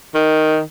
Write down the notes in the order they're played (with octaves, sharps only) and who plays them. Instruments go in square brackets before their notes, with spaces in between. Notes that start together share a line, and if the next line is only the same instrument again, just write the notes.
[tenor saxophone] D#3